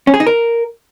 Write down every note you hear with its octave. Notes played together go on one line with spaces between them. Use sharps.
C#4
G#4
D#4
A#4